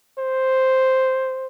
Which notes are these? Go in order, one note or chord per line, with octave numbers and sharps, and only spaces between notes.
C5